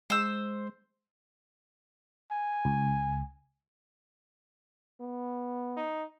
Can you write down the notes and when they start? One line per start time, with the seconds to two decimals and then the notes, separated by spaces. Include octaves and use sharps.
0.10 G#3 C5 E6
2.32 G#5
2.65 C#2
5.00 B3
5.77 D#4